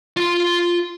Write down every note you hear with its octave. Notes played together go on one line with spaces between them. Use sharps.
F4 C6